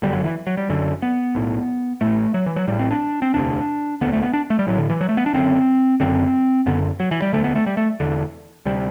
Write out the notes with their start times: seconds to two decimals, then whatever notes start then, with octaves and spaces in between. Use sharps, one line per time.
0.02 G1 F#2 D3 G3
0.13 F#3
0.24 E3
0.47 F#3
0.57 G3
0.69 F#1 F#2 D3
1.02 B3
1.35 B1 A2
2.01 A1 A2 A3
2.34 F#3
2.46 E3
2.56 F#3
2.68 A1 A2 G3
2.79 C4
2.91 D4
3.22 C4
3.34 E1 D2 C3 D4
4.01 E1 D2 D3 B3
4.13 A3
4.22 B3
4.33 D4
4.50 A3
4.59 G3
4.67 A1 A2 F#3
4.78 D3
4.90 E3
5.01 F#3
5.09 A3
5.17 B3
5.26 D4
5.33 F#1 F#2 D3 C4
6.00 F#1 F#2 D3 C4
6.66 F#1 F#2 D3 B3
7.00 F#3
7.11 E3
7.22 G3
7.33 E1 D2 D3 A3
7.44 B3
7.55 A3
7.66 G3
7.77 A3
8.00 E1 E2 D3
8.65 D2 C3 G3